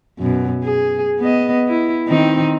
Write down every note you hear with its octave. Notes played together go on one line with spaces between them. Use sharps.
F#2 B2
G#4
B3 D#5
E4
D#3 C4 D#4